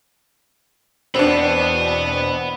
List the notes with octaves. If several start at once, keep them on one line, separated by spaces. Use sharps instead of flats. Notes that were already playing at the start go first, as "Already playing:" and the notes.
E2 B2 C4 D4 F#5 B5